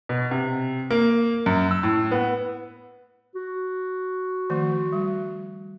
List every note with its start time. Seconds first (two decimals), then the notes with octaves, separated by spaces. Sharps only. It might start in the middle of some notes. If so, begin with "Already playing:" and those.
0.09 B2
0.31 C3
0.90 A#3
1.46 F#2
1.71 E6
1.83 A2
2.11 B3
3.35 F#4
4.50 D#3 F3 A3
4.92 G3